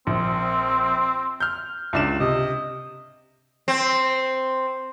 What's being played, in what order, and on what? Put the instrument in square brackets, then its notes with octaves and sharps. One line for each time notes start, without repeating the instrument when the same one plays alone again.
[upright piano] A#1 [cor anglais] C4
[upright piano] F6 G6
C#2 D4 E7
[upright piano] C3 [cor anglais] D#5
[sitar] C4